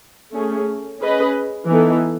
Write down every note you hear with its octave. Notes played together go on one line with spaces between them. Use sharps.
A3 C#4 G#4
C#4 G#4 B4 D#5
E3 B3 D#4 A4